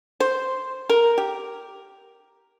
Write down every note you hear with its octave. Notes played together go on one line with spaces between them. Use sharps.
C5
A#4
G4